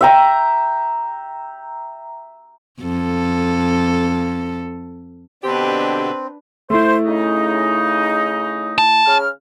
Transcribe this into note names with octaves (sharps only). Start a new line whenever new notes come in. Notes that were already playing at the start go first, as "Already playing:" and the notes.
E5 G5 A#5
F2 A4
B2 D3 C4 D4 G4 B4
A3 E4 C5
C#3 D#4
A5
C#3 F6